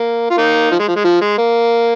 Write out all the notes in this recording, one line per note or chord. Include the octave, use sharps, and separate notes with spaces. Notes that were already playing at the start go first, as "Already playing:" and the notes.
Already playing: A#3
F4
A#3 D#4
F3
G#3
F3
G#3
F3
G#3
A#3